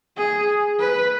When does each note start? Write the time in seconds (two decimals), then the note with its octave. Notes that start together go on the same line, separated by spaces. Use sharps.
0.17 G#4
0.79 B4